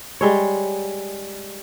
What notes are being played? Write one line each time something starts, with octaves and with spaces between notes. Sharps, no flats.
G3 G#3 C#5